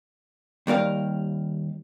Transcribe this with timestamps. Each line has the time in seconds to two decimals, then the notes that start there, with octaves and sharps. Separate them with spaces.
0.67 D#2 G3 A#4 F5